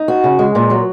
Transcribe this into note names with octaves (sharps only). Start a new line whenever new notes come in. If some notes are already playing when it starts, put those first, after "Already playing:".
Already playing: D#4
F#4
C#3
G#3
A#2
F#3